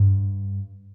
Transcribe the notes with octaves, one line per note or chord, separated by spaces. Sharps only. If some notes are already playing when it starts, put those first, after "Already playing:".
Already playing: G2